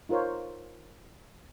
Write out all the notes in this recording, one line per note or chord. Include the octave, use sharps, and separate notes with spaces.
D#4 F4 A#4 C5 C#5